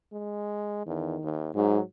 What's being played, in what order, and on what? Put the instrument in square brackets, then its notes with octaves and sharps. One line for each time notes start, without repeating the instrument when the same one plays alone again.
[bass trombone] G#3
[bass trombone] E2 [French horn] D#3
[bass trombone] D#2
[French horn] G#2 [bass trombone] F#3